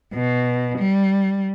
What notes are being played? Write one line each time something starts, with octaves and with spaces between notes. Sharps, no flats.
B2
G3